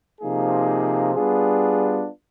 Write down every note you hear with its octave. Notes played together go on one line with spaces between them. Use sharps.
C3 F3 A#3 D#4 G#4
G3 B3 D4 F4 G#4